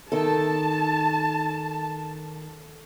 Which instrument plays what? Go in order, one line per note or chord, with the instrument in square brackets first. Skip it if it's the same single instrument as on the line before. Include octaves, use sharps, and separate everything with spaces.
[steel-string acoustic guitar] D#3 A4 [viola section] A5